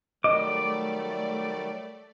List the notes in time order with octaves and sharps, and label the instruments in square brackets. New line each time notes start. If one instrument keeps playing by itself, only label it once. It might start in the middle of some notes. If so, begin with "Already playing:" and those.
[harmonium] D#3 F#3 G3 [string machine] A3 D5 [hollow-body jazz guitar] D#5 [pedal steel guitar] D6